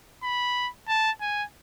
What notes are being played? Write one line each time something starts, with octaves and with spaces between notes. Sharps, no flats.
B5
A5
G#5